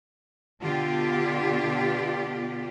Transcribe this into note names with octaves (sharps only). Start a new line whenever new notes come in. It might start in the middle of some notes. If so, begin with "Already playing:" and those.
B2 D3 B3 F4 G4 D5